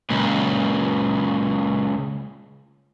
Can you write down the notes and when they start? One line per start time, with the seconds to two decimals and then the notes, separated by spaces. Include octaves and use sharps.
0.10 C#2 A#2